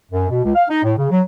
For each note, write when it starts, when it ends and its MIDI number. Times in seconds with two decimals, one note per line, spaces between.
0.12 0.26 42
0.30 0.42 47
0.44 0.51 37
0.55 0.64 77
0.69 0.83 63
0.84 0.93 45
0.98 1.07 49
1.11 1.20 54